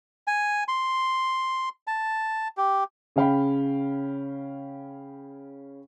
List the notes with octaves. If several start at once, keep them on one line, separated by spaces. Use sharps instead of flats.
G#5
C6
A5
G4
C#3 C#4 F5 G5 B5